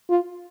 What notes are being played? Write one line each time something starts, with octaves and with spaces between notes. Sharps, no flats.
F4